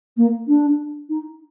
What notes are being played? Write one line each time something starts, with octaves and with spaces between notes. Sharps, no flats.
A#3
D4
D#4